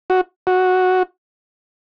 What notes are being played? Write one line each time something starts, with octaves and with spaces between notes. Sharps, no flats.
F#4
F#4